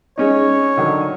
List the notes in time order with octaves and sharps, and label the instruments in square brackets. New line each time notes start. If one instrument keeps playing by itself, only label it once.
[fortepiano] G#3 C#4 D#4 [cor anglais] C#5
[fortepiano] D3 D#3 F#3